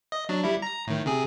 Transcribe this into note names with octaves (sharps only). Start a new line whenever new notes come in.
D#5
F#3 D4
G3 E4
A#5 A#6
A2 D#3
C3 G#4